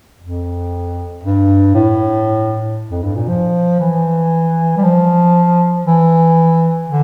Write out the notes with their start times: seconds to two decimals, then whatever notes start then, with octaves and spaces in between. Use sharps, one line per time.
0.20 F2
1.24 G2
1.75 A2
2.90 F2
3.03 G2
3.16 A#2
3.29 F3
3.80 E3
4.77 G3
4.83 F3
5.85 E3
6.88 D3